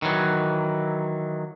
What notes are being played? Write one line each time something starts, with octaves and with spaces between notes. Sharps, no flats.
D#3 E3 F#3